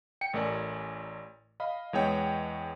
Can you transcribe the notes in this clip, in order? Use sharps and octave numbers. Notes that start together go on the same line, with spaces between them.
G5 C#7
A1 A3 A#4 D5 G#5
D#5 F5 B5
E2 G#3 B3 C#5 D#5 G5